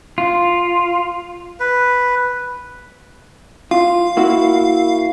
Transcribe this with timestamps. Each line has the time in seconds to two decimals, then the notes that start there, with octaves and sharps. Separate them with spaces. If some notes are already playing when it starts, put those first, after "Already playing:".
0.18 F4
1.60 B4
3.71 F4 F5
4.17 A#3 E4 F#4